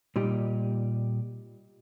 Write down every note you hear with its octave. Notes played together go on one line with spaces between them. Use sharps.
A#2 G3 D#4 G4